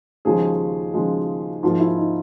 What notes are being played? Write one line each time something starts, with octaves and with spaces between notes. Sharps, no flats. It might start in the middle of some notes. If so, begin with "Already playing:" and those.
D#2 C#3 F3 G#3 G#4
D#2 C#3 F3 G#3
G#2 F3 A#3 F4
E4
D#4